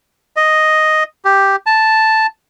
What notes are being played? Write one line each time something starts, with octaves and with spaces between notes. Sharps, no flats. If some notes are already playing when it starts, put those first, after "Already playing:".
D#5
G4
A5